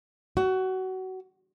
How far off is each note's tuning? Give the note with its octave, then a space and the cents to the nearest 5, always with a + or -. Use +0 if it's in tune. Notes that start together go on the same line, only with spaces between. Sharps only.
F#4 +25